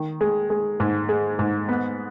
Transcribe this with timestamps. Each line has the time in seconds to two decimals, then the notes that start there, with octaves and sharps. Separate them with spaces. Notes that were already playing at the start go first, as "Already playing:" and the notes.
Already playing: D#3
0.21 G#3
0.50 G#3
0.80 G#2
1.09 G#3
1.39 G#2
1.69 B3